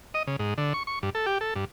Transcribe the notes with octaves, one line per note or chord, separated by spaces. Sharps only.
D#5
C#3
G#2
D3
C#6
C#6
G2
A4
G4
A4
G2